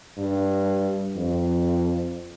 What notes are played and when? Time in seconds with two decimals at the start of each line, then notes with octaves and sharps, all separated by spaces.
0.17 G2
1.16 F2